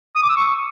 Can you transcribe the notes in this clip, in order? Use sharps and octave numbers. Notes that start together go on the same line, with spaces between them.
D#6
D6
E6
C#6